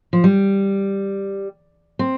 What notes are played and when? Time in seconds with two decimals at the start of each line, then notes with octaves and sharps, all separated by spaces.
0.13 F3
0.24 G3
1.99 C4